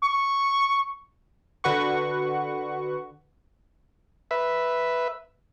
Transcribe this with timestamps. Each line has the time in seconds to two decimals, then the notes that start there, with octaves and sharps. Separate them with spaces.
0.03 C#6
1.64 D3 F#4 B4 F#5 C#6
4.31 B4 E5